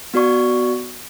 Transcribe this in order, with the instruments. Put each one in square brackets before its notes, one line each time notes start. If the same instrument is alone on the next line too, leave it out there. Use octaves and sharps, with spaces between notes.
[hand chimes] B3 F#4 D5 C#6